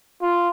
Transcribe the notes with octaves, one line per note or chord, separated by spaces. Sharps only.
F4